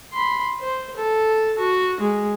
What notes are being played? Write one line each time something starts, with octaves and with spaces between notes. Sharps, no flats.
B5 C6
C5
A4
F#4
G#3